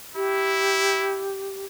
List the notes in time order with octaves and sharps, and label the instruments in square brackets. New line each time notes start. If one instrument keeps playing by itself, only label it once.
[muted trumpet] E4 [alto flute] G4